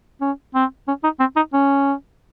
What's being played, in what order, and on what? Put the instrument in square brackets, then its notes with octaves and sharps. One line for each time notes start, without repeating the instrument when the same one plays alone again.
[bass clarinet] C#4
C4
C#4
D#4
C4
D#4
C#4